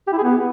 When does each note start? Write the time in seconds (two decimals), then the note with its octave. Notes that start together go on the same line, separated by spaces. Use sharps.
0.07 G4
0.13 E4
0.18 G#4
0.23 B3